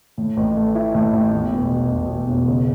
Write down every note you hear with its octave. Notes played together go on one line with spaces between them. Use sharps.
A2
A1
A3
E4
A2
A1
E2
E1
B2
E1
E2
E1
C#3